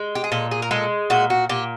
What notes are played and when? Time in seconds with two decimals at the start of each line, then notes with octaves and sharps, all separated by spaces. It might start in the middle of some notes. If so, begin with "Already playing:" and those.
Already playing: G#3
0.15 G4
0.24 G#4
0.32 A#2 A4
0.51 G#4
0.62 A#4
0.71 G#3 A4
1.10 A#2 F#4
1.30 F#4
1.49 A#2 G4